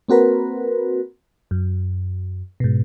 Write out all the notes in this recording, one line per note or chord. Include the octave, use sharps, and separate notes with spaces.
A#3 C4 F#4 A#4 B4
F#2
G#2 B2